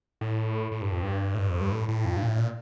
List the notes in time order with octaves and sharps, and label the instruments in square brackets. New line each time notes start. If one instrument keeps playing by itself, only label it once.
[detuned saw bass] A2
A2
G2
F2
G2
A2
G2
F2
G2
A2
A2
F2
G2
A#2
A2
A#2